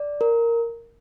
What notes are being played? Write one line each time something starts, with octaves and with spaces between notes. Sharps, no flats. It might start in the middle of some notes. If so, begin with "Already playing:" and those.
Already playing: D5
A#4